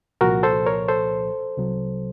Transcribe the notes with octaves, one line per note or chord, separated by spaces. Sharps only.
C2 A#2 F3 F#4 A#4
A4 C5
A#4 C#5
A4 C5
C2 C3 F#3